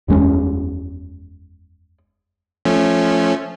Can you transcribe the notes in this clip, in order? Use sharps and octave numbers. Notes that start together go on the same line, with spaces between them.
F#1 E2 G#3 C#4
F3 A3 C#4